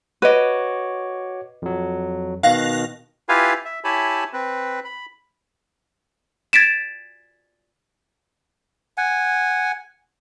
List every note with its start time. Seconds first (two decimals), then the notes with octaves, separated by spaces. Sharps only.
0.22 F#4 B4 C#5 D#5 D6
1.62 F2 F#3
2.43 B2 D#3 F5 F#6 A#6
3.29 E4 F4 G4 B4 F5 G#5
3.65 E5
3.84 E4 G4 C#5 G#5 A5 B5
4.33 C4 B4
4.84 B5
6.53 G#6 A6 B6 D7 E7
8.98 F#5 G#5